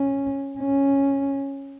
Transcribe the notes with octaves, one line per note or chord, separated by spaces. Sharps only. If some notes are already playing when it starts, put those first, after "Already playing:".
Already playing: C#4
C#4